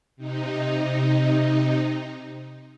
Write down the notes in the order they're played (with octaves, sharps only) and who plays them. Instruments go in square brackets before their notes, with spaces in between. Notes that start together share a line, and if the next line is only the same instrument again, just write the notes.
[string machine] C3 D#4